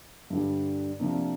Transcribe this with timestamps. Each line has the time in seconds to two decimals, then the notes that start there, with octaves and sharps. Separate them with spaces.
0.30 G2 D3 G3
0.99 C3 F3 A#3 D4